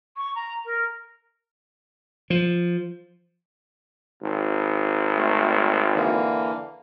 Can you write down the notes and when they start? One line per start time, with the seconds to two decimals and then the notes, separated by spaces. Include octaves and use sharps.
0.17 C#6
0.35 A#5
0.65 A#4
2.30 F3
4.22 G#1
5.15 A3
5.95 D3 E3 A#3